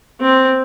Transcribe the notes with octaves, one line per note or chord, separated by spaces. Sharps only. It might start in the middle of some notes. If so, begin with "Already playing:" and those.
C4